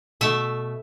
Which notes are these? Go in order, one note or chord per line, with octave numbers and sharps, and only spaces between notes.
B2 A3 E5